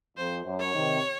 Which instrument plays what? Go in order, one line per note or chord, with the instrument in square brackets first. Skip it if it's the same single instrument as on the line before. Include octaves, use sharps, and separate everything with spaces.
[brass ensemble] F2 [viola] C5
[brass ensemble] F#2
[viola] C#5
[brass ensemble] C3 D#3